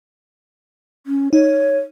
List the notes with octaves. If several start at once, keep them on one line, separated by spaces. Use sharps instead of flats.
C#4
D#4 C#5